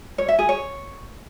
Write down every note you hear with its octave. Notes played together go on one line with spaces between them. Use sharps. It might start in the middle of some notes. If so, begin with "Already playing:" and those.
C#5
E5
G#4
C#5